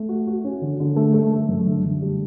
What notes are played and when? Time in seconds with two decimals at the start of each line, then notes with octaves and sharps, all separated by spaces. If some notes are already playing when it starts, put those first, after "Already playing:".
Already playing: A3
0.09 F#4
0.27 F#4
0.44 C#4
0.62 D3
0.80 D3
0.96 A3
1.14 A3
1.32 A3
1.49 F#2
1.66 D3
1.84 D3
2.02 G3